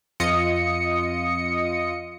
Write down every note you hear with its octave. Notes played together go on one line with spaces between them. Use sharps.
F2 F4 D#5 D#6 C#7